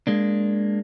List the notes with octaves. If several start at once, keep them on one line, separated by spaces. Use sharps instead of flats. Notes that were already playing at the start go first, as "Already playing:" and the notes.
G#3 A#3 D4